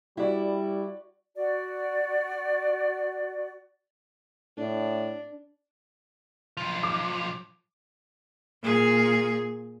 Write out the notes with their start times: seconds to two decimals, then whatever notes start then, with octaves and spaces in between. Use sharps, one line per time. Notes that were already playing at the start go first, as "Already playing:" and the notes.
0.17 G3 E4 F#4 D5
1.35 F#4 D5
4.57 A2 D4
6.57 B1 F3
6.83 D6
8.63 A#2 G#4